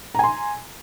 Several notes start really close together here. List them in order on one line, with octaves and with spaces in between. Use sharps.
A#5 G#5 C6